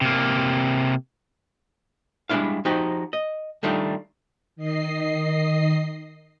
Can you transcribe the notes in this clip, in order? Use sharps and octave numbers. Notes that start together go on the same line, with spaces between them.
C3 A#3
G3 G#3 A#3 D4 E4 F5
F3 D#4 F#4 G4
D#5
D#3 G3 A3 D4 D#4 F4
D#3 D#5 C7